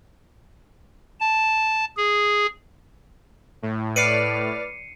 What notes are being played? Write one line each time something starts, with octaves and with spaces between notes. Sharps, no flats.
A5
G#4
A2
B4 D5 F6 C7 C#7 D#7